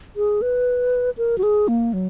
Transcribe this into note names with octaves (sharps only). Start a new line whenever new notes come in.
G#4
B4
A#4
F#4
G#4
A#3
F#3